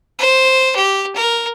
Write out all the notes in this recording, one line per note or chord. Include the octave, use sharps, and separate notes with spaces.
C5
G4
A#4